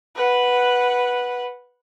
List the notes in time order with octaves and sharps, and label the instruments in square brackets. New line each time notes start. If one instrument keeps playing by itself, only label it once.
[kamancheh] B4 F#5